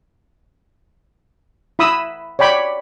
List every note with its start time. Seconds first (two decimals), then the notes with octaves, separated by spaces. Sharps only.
1.79 E4 B5 D#6 E6
2.39 C#5 D5 G5 B5